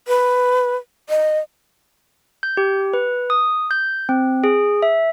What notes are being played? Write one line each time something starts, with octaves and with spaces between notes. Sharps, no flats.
B4
D#5
G6
G4
B4
D#6
G6
C4
G#4
E5